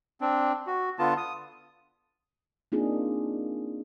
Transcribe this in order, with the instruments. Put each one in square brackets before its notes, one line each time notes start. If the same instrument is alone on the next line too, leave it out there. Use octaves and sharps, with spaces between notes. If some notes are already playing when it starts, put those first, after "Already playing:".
[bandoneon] C4 D4
F#4
D3 B3 F4 A5
D#6
[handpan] A#3 C4 D4 D#4 F4 G#4